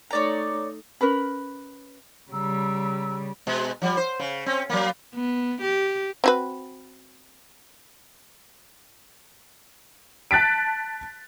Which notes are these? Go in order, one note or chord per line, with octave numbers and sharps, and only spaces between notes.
A3 D#4 C#5 D5 A#5
C#4 A#4 B4 B5
C#3 G3 A#5 E6
B2 G#3
F3 G3
C5
C#3
C4 C#4
F#3 A#3
B3
G4
C4 F#4 B4
A5 F#6 A6 B6 D7